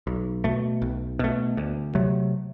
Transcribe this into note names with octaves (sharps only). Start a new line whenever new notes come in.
B1
B2 A3
B1
B2 A3
D2
C3 F#3 A3